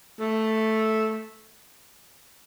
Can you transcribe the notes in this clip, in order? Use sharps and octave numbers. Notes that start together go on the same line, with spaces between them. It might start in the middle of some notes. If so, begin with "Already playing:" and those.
A3